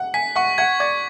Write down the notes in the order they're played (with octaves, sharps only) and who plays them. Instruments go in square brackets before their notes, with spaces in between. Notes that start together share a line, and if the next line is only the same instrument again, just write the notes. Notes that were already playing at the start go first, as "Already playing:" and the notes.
Already playing: [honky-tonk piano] F#5
[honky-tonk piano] G#5 [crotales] B6
[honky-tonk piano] F#5 [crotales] C#6
[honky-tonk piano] F#5 [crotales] G#6
[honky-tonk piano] D5 [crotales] G#6